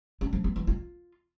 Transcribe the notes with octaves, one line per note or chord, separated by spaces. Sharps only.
C#4
F3
B3
E3
F4